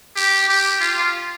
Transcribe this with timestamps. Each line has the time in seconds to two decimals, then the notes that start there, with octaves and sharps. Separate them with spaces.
0.16 G4
0.48 G4
0.81 F4